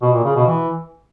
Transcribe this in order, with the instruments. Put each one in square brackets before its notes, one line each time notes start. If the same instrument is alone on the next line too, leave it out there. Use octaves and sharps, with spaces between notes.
[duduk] B2
A#2
C#3
B2
E3